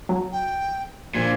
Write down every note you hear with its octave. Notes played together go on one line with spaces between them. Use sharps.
F#3
G5
A#1 A#2 G#6